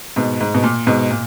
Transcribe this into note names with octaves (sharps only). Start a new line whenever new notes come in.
G#2 B2
G#2
B2
A#2
G#2 B2
A#2